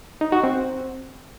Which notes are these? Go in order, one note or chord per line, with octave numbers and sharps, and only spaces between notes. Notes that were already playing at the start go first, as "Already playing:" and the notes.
D#4
F#4
C4